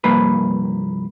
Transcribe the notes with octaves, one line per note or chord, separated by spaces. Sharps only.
C2 G2 F3 A#3 B4